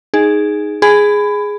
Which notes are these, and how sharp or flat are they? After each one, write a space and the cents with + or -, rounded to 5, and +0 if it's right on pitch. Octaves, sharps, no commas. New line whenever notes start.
D#4 +0 G#4 +0
G#4 +0 B5 +20